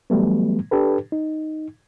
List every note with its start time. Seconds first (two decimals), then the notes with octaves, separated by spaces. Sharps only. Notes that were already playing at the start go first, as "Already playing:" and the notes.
0.10 E3 F#3 G3 A3 B3
0.71 D4 G4 A4 B4
1.12 D#4